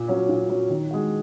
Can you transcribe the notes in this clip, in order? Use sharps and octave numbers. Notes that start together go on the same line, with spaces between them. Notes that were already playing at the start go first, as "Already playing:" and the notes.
Already playing: A#2
F#3 C#4
A#2
F#3 C#4
D#3
G#3 F#4